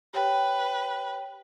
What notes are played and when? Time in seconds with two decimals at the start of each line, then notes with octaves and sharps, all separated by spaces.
0.14 G4 B4 C#5 G5